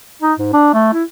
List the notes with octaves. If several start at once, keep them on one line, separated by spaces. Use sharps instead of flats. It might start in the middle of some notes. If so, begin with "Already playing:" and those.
D#4
G#2
D4
A3
E4